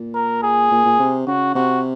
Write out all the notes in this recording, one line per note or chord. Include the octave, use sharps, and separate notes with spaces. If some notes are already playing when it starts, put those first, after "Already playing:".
Already playing: A#2
A#4
G#4
A#2
A#2
C3
C#3 F#4
C3 F#4